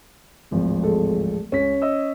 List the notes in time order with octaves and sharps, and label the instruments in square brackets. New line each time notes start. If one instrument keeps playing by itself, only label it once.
[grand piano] D1 G#1 F3
[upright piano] G#3 A4
[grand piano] C#2 B6 [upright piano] C#4
[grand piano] D#5 E6